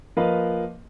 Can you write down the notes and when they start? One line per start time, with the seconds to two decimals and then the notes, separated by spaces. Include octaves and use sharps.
0.17 F3 A#3 A#4 B4 D#5 F5